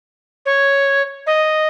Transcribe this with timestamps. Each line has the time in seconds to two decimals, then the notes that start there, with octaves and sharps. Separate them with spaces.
0.46 C#5
1.27 D#5